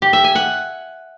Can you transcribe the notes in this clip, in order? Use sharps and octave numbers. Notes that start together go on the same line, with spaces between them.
G4
E5
G#5
F#5